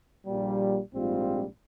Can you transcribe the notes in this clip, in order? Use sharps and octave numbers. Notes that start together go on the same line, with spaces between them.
A#1 A#2 G3
A#1 G#2 G3 C4 F4